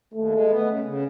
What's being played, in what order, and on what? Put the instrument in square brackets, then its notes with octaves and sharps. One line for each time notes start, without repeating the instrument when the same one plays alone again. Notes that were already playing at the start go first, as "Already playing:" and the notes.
[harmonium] D#2 [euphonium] A3
[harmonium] G#3
B3
C#3
C#3